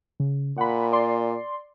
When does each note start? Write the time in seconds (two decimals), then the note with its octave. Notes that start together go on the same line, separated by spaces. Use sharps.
0.20 C#3
0.58 A#2 F#5 B5
0.92 D5 C6